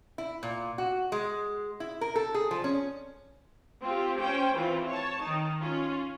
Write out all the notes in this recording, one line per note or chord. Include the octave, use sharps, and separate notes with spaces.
E4
A#2
F#4
G#3
E4
A#4
A4
G#4
F3
C#4
C4 F4 G4
C#4 C5 G5
E3 C4 F4
C#5 A5
D#3 D#4
C#4 F4